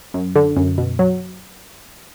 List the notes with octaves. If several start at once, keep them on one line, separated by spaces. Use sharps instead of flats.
F#2
D3
F#2
B2
F#3